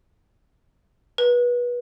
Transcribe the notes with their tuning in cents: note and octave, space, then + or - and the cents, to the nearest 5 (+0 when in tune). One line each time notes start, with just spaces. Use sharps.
B4 -25